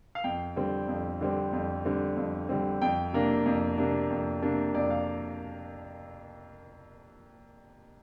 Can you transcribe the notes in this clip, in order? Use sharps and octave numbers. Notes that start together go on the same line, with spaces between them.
F5
F2 G5
D3 G3 C4
F2
D3 G3 C4
F2
D3 G3 C4
F2
D3 G3 C4
F2 G5
C3 A#3 D4
F2
C3 A#3 D4
F2
C3 A#3 D4
F2 D5
F5